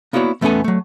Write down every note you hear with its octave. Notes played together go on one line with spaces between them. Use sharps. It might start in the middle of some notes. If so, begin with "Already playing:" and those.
A#3 B3 E4 F#4 C#5 D5
E2 A3 B3 C#4 A4 G#5
F#3 A3